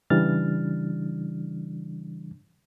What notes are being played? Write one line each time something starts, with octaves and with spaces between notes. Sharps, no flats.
C#3 E3 G3 D4 F6 A6